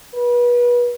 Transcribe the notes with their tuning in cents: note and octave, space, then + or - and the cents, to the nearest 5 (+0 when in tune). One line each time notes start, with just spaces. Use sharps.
B4 -30